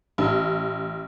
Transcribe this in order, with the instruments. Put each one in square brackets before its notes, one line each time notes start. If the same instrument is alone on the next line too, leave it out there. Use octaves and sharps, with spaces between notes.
[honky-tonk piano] A1